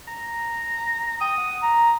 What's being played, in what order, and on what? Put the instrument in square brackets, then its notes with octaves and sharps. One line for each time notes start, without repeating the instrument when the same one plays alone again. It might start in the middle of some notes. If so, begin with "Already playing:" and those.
[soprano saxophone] A#5
[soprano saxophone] G5 [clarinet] D#6
[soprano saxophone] F#5
[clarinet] A#5